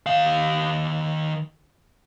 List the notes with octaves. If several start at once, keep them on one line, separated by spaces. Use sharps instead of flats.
D#3 F5